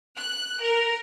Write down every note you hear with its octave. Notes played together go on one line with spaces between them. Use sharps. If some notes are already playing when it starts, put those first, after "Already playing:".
F#6
A#4